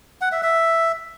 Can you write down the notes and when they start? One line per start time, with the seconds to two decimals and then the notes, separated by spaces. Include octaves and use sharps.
0.21 F#5
0.32 E5
0.43 E5